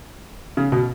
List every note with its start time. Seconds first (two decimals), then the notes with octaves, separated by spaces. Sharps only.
0.57 C#3
0.72 B2